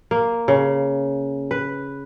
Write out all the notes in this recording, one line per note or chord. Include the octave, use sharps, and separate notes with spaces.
A#3
C#3
B4